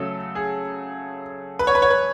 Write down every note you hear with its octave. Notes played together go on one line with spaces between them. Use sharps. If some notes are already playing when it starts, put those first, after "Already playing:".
Already playing: C#3 F#3 A3 A4
G#4
B4
C#5
B4
C#5
B4